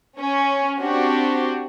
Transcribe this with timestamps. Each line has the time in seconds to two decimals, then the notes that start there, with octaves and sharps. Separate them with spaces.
0.19 C#4
0.82 C4 D4 F#4 G4